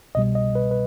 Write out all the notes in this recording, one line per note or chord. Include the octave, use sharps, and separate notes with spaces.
C2 B2 G3 D#5
D#5
B4
B4